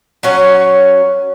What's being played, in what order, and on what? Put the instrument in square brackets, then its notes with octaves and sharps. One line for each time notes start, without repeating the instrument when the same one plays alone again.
[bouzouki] F#3 C#4 F#5